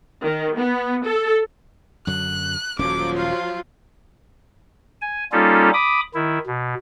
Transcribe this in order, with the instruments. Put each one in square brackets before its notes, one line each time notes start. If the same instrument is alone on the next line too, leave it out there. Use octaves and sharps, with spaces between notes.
[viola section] D#3
B3
A4
[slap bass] F#2 D3 F#3 [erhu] F#6
[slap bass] D#1 C#4 [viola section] F3 F#3 [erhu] D6
[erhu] F4
[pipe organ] G#5
G3 A#3 C#4 D#4 F4 A4
B5 D6 D#6
D#3 E4
B2